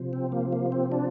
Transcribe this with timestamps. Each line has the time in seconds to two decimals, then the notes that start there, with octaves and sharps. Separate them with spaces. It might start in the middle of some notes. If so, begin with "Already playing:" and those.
Already playing: C3 F3
0.13 C4
0.32 A#3
0.52 A#3
0.72 C4
0.92 D4